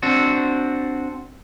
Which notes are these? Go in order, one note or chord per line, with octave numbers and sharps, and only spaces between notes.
C4 D4 F#4